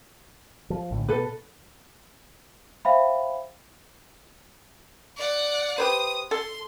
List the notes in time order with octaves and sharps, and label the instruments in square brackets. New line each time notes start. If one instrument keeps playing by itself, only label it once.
[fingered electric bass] F3
A#1 A2 D3
[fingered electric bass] B2 [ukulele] A4 B4
[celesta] C5 E5 F5 G5 B5
[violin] D5 F#5
[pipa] G4 B4 C5 [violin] D#6 D#7
[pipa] A4 [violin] C6